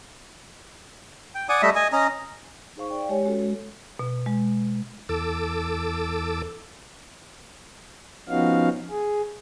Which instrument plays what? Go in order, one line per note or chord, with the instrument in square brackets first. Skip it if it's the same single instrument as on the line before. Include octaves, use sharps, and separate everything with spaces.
[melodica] G5
D5 F#5 G#5 D#6
G3 A3 D#5 E5
D#5 G#5
C#4 D#5 A#5
[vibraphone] D#4 G#4 C5 F5 C#6
D5 G5
G#3 G4 C#5 G#5
G#3 C#4 F#4 A4 C#5
G#3
[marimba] B2
G#3
[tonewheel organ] E2 A4 D6 E6
[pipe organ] F3 B3 C#4 D#4 F#4 F5
G#4